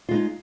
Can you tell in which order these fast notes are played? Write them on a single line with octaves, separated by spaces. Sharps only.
F4 G#3 D#4